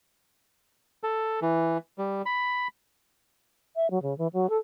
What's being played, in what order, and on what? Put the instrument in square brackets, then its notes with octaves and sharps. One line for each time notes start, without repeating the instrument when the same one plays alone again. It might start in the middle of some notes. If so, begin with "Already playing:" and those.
[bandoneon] A4
E3
G3
B5
[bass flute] E5
F#3
C#3
E3
F#3
A4